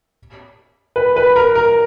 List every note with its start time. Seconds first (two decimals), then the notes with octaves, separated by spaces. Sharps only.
0.96 B4
1.16 B4
1.36 A#4
1.55 A#4